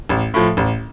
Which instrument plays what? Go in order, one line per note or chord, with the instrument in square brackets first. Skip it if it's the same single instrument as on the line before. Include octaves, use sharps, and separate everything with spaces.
[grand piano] A1
A2 F3
A1